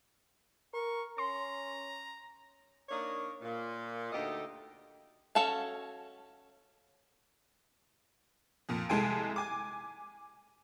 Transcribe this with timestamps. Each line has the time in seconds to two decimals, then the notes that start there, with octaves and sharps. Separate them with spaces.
0.74 A#4 C#6
1.18 C#4 A#5 C6
2.89 A#3 D4 D#4 C#5
3.42 A#2
4.12 D2 D#4 G4 A4 D#5
5.35 C#4 F#4 A4 F5 A5
8.69 F2 A#2
8.89 C2 G#3 A4 G#5 D7
9.36 G#5 D6